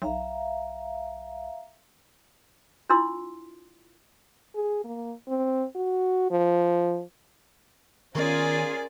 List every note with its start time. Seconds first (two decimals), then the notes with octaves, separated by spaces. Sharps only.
0.02 B1 E5 F5 A#5
2.89 D4 E4 F4 C6 E6
4.55 G#4
4.84 A#3
5.28 C4
5.75 F#4
6.31 F3
8.15 D#3 B3 C#4 F4 G#4 A#4 D5